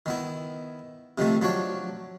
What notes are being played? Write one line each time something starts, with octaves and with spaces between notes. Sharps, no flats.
D#3 B3 E4
C3 D#3 F3 A3
F3 F#3 D4 C#5